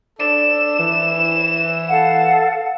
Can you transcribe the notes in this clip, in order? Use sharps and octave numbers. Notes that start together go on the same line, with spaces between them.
D4 A4 D5 E7
E3
A4 F5 F#5